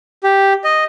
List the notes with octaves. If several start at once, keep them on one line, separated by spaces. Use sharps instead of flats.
G4
D#5